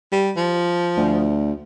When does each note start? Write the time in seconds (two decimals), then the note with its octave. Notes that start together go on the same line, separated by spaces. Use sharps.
0.12 G3
0.37 F3
0.97 D2